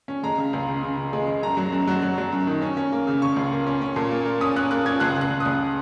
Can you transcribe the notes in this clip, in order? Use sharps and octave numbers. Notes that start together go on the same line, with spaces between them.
C#4
G#3 A#5
C#3
C#2
C#3
C#3
C#3
G#3
G#3
F#2 A#5
F#3
F#2
F#3
F#3
F#3
F#2
D#3
C#4
C#4
A#3
C#3
C#3 C#6
C#2
A#3
C#4
C#4
A#2
A#3
A#3
C#4 D#6
C#4 F#6
A#3 F#6
C#4 G#6
C#2 F#6
C#2
F#6
C#3
D#6
C#2